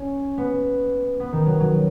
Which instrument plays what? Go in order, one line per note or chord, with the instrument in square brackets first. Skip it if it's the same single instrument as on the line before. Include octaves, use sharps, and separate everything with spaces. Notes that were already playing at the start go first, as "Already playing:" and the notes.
Already playing: [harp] C#4
B3
B3
D#3
F#3
F#3